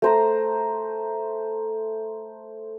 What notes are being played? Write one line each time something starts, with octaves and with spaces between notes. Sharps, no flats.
A3 C5 A#5